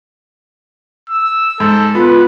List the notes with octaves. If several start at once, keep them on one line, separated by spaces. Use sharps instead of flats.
E6
G#2 A4
B3 F4 B4